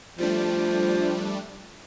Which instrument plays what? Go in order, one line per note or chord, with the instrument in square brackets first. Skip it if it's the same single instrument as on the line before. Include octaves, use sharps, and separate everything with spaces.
[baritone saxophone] F3 [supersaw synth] G3 A3 D4